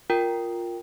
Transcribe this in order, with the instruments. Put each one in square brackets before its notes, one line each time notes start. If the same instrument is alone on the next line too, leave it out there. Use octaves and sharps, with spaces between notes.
[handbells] F4 A#4 G5